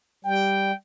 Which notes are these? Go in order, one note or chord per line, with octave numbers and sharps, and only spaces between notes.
G3 G5